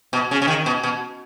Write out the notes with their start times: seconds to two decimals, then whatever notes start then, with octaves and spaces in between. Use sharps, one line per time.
0.13 B2
0.31 C#3
0.42 C#3
0.48 D#3
0.66 B2
0.83 B2